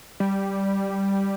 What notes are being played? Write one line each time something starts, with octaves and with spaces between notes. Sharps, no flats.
G3